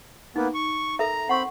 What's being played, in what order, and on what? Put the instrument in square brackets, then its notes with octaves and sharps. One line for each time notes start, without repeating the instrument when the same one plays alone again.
[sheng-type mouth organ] A#3 B3 [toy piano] D#4
[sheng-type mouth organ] C#6
[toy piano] A4 A#4 E5 [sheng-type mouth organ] A#5
[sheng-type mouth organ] C4 B5 [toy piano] F#5 C#6